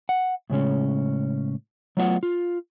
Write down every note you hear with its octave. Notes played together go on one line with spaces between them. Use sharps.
F#5
A2 C#3 G#3 C#4
F#3 A3 B3 F4 E5 F#5
F4